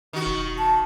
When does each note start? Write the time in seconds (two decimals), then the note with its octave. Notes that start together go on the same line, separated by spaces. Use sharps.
0.13 D#3 F#4
0.26 E1
0.58 A5